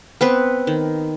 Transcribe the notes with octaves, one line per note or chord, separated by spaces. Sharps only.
B3 C4 B4
D#3